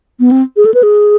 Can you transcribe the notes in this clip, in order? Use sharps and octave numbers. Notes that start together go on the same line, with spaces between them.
B3
C4
G#4
A4
B4
G#4